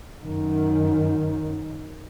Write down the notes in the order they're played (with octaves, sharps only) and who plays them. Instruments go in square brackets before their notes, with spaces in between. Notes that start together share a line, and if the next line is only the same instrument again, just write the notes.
[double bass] F#2 D#3